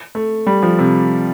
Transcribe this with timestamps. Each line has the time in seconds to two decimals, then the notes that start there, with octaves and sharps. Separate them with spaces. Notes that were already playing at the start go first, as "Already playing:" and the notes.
0.15 A3
0.47 G3
0.63 F3
0.79 C3